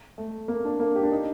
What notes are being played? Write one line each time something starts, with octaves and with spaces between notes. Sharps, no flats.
A3
A#3
D4
A#3
G4
D4
D#4